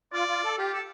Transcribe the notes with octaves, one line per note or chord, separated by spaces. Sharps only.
F4 D5
F4
A4
F4 G4
A4